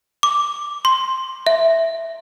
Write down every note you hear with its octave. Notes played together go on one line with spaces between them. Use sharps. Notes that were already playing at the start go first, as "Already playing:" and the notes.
D6
C6
E5